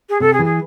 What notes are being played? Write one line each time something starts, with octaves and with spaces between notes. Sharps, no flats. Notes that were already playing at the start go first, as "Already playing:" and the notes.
G#4
C3 A4
G#4
E3
G#4